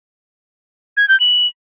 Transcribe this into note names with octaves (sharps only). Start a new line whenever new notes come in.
G#6
G6
F#7